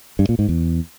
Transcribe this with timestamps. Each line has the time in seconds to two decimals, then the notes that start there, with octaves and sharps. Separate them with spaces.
0.19 G2
0.29 A#2
0.39 G#2
0.49 E2